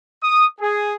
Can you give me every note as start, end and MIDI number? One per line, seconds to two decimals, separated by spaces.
0.23 0.45 87
0.60 0.94 68